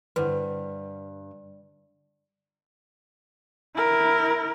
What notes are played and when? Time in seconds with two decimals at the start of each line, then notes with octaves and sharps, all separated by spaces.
0.16 G2 D3 E4 B4 F#5
3.75 E4 A#4